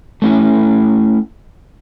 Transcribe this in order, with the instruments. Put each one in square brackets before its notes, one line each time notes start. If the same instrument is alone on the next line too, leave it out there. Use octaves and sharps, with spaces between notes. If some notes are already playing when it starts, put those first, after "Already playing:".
[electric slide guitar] A3 C#4 E4